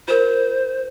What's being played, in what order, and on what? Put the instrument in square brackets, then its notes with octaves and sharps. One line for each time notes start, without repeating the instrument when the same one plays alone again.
[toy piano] F4 A#4 [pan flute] C5